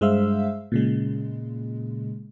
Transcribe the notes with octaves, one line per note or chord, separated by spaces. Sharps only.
G2 G#3 C5 E5 F5 E6
A#2 C#3 G#3